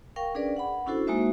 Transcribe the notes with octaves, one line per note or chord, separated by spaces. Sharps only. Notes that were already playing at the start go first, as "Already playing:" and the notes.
A#4 F5 G5 C#6
C#4 D4 G#4 A#4 B4 D5
F#5 B5
C#4 D4 E4 F#4 A4 C5
G#3 A#3 D#4 F#4 C5 E5